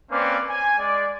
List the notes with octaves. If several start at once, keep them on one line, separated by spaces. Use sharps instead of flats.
A#3 C4 C#4 B4 D5
G#5
G#3 D5